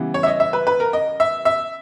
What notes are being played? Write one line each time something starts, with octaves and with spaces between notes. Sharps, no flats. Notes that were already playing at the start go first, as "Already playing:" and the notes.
Already playing: C#3 E3 G3 B3
C#5
E5
D#5
E5
B4
B4
A#4
D#5
E5
E5